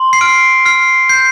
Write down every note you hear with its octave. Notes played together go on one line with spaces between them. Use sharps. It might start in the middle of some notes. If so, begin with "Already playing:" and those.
Already playing: C6
C7
F6 D7
F6 C7
G6 C7